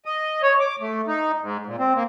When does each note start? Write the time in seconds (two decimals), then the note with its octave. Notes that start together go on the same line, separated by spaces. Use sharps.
0.05 D#5
0.42 C#5
0.59 D6
0.80 A3
1.07 D#4
1.41 G#2
1.66 A#2
1.78 C4
1.95 A#3